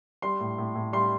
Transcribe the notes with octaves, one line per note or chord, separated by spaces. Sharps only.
G3 C6
A2
A2
A2
G3 C6